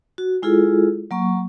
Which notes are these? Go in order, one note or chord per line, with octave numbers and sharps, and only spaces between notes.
F#4
G#3 E4 F4 G#4 A4
F#3 A#3 C#6